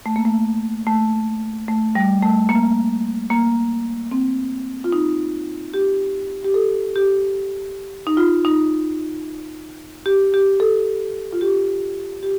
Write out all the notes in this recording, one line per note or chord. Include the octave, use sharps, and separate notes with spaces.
A3
A#3
A3
A3
A3
G3
A3
A#3
A#3
C4
F4
D#4
G4
G4
A4
G4
D#4
F4
D#4
G4
G4
A4
F4
G4
G4